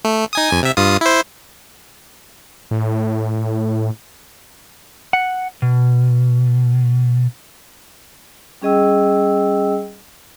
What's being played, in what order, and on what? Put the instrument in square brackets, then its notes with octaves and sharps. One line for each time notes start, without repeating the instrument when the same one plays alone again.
[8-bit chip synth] A3
D#4 G#5 D#6
F2 G#5
C3 E5
G2 F4 D#6
E4 C5
[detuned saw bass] A2
[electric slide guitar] F#5
B2
[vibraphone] G3 C#4 G#4 D#5 G5 E6